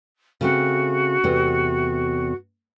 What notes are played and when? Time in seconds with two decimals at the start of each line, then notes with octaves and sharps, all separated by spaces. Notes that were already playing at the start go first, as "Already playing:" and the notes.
0.41 C#3 A3 C4 F#4
1.24 E2 C3 A3